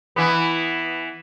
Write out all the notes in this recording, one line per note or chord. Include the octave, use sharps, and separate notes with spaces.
E3 B3